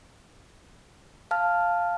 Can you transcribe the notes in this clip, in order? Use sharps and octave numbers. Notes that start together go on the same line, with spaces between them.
F5 A5 F6